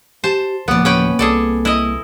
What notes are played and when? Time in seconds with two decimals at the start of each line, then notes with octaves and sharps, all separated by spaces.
0.24 G4 C5 A5
0.68 D1 F3 A#3 B3 D5
0.85 C#4 B4 G5
1.19 C2 G#4 A4 D5
1.65 E4 D#5